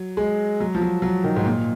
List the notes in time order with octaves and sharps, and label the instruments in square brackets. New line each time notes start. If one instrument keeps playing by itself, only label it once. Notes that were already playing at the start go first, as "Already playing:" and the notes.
Already playing: [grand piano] F#3
G#3
F#3
F3
F#3
F#3
D#3
G#2
A#2